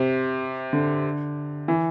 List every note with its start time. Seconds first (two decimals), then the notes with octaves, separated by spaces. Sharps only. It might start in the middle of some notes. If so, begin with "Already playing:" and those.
Already playing: C3
0.73 D3
1.68 E3